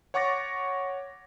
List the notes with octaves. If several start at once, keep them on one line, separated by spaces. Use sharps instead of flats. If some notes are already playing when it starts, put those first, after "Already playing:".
C#5 F#5 C#6 D6 A6 A#6